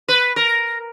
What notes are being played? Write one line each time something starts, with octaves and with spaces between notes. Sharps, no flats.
B4
A#4